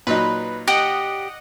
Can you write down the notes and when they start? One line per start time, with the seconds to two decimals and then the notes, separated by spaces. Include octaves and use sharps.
0.07 A#2 F#3 D#4 B4
0.68 G4 D#5 F#5